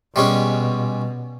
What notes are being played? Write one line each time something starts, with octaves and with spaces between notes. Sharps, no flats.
B2 G3 G#3 C#4